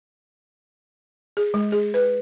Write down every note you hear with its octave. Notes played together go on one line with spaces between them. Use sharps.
G#4
G#3
G#4
B4